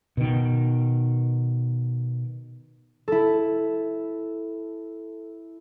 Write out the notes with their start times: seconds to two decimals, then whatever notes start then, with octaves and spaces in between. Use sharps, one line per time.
0.17 B2 D#3
3.08 E4 A4